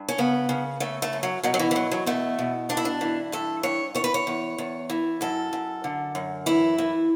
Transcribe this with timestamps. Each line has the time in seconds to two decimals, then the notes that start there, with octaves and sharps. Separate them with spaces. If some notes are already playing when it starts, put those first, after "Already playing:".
Already playing: G2
0.08 C#4
0.18 C#3 B3
0.49 C#3
0.80 C#3 A3
1.02 A3
1.13 F#2
1.23 F#3
1.43 B2 F#3
1.54 F#3
1.59 E3
1.71 E3
1.75 E2 F#3
1.91 F#3
2.06 B2 A3
2.39 B2
2.69 G2 D4
2.77 E4
2.85 D4
3.01 E3
3.32 G2 A4
3.63 G2 C#5
3.95 E2 C#5
4.04 B4
4.14 C#5
4.27 E2
4.58 E2
4.90 E3
5.21 F#2 A4
5.53 F#2
5.84 D3
6.15 F#2
6.46 E3 E4
6.78 E3